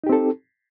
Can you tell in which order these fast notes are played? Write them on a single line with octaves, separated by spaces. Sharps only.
D#4 G4 C4 A4